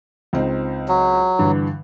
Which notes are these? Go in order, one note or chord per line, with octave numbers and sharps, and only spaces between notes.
C#2 C4 D#4
F#3
G2 D3 E3